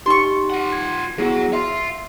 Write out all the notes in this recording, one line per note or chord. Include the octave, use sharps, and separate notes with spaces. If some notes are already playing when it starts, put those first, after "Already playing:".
D#4 G4 C6 C#6
F4 F#5
G#6
F#3 B3 E4 G#4
E5 F5 C6